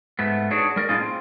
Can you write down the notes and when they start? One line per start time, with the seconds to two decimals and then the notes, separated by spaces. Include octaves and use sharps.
0.19 G#2 A3 B3
0.51 D4 D#4 F#4 G#4 C#5
0.76 G3 A#4 D5
0.89 A2 D#4 F4 G#4
1.01 C4